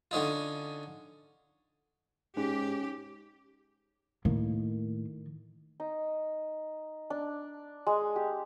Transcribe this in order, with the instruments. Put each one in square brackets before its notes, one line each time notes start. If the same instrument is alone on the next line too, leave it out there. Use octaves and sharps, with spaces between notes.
[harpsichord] D3 C#4 D#4 F4
[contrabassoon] G#2 [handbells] C#4 [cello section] G4
[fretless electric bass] A2 A#3 [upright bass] D#3
[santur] D#4
D4
G#3
G4